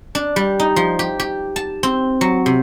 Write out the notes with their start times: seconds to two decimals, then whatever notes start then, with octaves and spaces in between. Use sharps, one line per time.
0.15 D4
0.36 G3
0.59 D#4
0.76 F3
0.99 G4
1.19 G4
1.56 A5
1.83 C4
2.21 F#3
2.46 C3